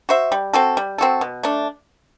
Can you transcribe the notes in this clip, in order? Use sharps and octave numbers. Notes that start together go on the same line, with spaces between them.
F#4 C5 E5
G3
C4 F#4 A4
G3
C4 F#4 A4
B2
A3 D4